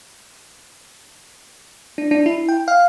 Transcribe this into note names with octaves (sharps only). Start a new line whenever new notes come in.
D4
D4
E4
G5
F5